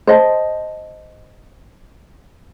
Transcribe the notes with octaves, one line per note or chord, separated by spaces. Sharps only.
C5 D#5 A5